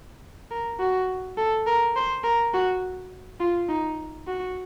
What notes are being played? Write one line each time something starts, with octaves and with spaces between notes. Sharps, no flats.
A#4
F#4
A4
A#4
C5
A#4
F#4
F4
D#4
F#4